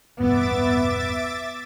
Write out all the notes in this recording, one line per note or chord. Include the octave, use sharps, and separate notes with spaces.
E1 A1 G2 B3 E5 D6 A6